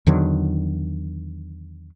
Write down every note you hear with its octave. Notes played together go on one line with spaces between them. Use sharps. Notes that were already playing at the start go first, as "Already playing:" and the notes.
E2 D3 D#3 F#3